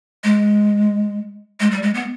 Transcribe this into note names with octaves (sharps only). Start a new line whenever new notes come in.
G#3
G#3
G3
G#3
B3